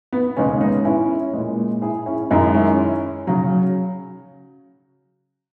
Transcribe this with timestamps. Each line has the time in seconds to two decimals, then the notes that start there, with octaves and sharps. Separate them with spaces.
0.12 B3
0.37 D#2 C#3 G#3 C#4
0.61 B3 D#4
0.85 C#4 E4
1.33 A#2 G#3
1.82 E4 G#4
2.06 C#4 E4
2.31 F#2 D#3 G#3 C#4 E4
2.54 C#4 E4
3.27 C#3 F#3